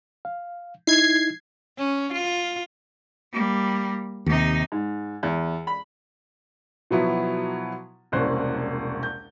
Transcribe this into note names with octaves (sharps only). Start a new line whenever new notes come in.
F5
D#4 E4 G#6 C7
C#4
F4
G3 A#3
D#2 C3 D#4
G#2
E2
B5
B2 F3 F#3 B3 E4
E1 C2 A#3 C#4 C5 F#6
G6